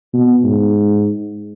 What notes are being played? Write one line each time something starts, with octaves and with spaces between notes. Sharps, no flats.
B2
G#2